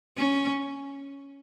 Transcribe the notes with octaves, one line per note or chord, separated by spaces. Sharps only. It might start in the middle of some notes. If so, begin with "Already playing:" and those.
C#4